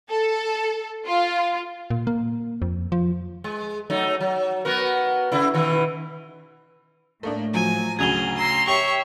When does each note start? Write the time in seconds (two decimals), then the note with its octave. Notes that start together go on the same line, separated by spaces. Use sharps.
0.10 A4
1.06 F4
1.90 A#2
2.07 A#3
2.62 F2
2.92 F3
3.44 G#3
3.90 F#3 A3 D#4
4.20 F#3
4.65 B3 F#4 A#4
5.32 C#3 E4
5.54 B2 D#3 E3
7.23 A2 A3 A#3 D4
7.54 F3 F#3 G#5
7.99 D2 C#3 F#3 G#4 G#6 F7 G7
8.38 A#5 C6 E6
8.67 G4 C#5 E5 C#6 C7 F7 G7